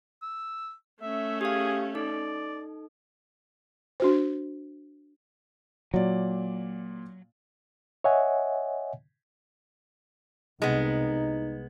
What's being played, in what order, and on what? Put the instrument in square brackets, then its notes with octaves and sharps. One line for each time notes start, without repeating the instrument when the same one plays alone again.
[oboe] E6
[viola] A3 C#4 [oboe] E5
[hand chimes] G4 F5 [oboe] G#4
[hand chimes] D#4 A4 [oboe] D5
[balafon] D4 F#4 C5
[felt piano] A#2 D5 [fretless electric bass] F#3
[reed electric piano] C#5 D#5 E5 F#5 G#5
[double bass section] C2 [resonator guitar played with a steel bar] G#3 B3 [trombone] D#4